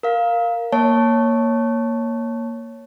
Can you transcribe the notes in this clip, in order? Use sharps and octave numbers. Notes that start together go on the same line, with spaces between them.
A#4 F5
A#3 C#5 A5